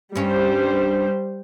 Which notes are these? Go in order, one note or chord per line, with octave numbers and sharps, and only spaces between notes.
G2 G3 C#4 C5